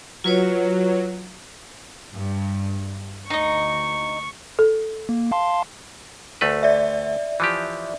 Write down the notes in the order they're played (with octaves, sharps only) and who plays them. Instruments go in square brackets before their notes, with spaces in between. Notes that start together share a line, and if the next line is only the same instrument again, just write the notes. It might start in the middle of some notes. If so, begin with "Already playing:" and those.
[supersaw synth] F#3 [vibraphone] F4 B4 C#5
[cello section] G2
[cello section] D2 [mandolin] D#4 D#5 [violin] C#6
[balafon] A4
[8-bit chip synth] A#3
F5 A5 C6
[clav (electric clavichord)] D2 A3 B4
[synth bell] D5 E5
[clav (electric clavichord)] E3 F3 G4